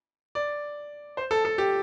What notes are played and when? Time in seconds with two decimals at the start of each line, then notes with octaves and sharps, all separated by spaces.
0.35 D5
1.17 C5
1.31 A4
1.45 A4
1.58 G4